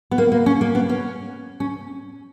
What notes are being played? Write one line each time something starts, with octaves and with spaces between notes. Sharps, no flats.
B3
A#3
A#3
C#4
A#3
B3
C#4
C#4